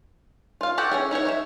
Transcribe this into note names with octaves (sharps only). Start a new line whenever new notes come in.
F4 F5
F#4 G4 A4 F#5 G5
C#4 E4 G#4
D#4 E4 G#4 C#5
D#4 C#5 E5